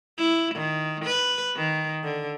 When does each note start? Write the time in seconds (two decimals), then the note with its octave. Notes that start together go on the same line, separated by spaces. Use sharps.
0.17 E4
0.55 D#3
1.05 B4
1.56 D#3
2.03 D3